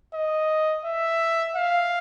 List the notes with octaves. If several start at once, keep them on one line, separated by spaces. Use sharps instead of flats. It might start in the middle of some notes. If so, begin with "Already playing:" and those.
D#5
E5
F5